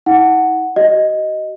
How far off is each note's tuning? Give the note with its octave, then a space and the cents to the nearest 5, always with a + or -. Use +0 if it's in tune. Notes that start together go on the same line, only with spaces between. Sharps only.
E4 -45 F#5 +0
F#4 +40 D#5 +0